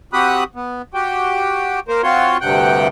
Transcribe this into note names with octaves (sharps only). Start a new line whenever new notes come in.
C4 F#4 G4 B5 D#6 F#6
B3
F#4 G4 G5
A#3 A#4 C5
C4 F4 F#4 C#5 C6
D2 G2 C3 F#5 G5